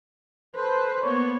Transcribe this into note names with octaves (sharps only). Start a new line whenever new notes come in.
A4 B4 C5
A#3 B3 C#5